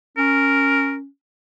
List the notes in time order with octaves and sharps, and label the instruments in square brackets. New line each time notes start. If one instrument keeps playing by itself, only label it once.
[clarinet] C#4 [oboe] A#4